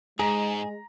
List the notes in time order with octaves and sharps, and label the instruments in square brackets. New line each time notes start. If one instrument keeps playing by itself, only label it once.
[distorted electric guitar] G#2 [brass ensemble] G#3 [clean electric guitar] G#4 [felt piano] A#5